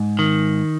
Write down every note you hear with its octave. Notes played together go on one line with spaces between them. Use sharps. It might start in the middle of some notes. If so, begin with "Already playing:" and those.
Already playing: G#2
D#3